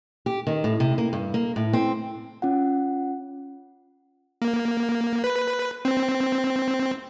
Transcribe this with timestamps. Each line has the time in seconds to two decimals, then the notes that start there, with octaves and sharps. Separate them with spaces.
0.26 G4
0.47 D#3
0.64 A2
0.80 C3
0.98 A#3
1.13 G2
1.34 A#3
1.56 A2
1.73 C4
2.42 C#4 F4 F#5
4.42 A#3
5.24 B4
5.85 C4